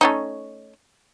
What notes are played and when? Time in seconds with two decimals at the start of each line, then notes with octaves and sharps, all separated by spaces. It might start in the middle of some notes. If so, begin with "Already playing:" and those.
0.01 A3 C#4 D#4